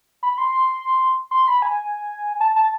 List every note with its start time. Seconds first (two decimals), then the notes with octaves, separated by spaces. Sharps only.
0.23 B5
0.38 C6
1.31 C6
1.48 B5
1.62 G#5
2.40 A5
2.56 A5